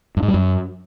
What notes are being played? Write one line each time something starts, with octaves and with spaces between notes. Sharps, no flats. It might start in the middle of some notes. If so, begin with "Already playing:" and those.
G2
G#2
G3
F#2